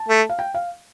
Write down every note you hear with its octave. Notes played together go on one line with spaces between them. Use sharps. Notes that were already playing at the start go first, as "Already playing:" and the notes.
Already playing: A5
A3
F5
G5
F5